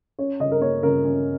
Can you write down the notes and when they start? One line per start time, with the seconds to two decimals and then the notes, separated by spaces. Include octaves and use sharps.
0.19 C#4 C#5
0.40 C#3 D#5
0.51 A#4
0.61 A#3 C#5
0.83 C#3 A#4
1.04 C#4